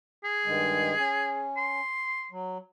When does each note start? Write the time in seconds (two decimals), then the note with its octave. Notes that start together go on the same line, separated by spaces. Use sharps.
0.24 G#4
0.45 G2 D#3 G#3
0.98 C#4
1.57 C6
2.31 F#3